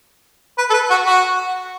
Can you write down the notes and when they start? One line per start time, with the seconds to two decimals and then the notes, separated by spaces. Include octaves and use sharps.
0.58 B4
0.70 A4
0.73 B4
0.90 F#4
1.07 F#4